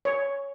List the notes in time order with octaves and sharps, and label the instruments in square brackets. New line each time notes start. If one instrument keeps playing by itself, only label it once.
[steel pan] C#5